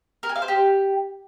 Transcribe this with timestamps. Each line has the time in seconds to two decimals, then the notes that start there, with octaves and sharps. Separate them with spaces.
0.23 A#4
0.29 G#5
0.36 F5
0.42 C5
0.48 G4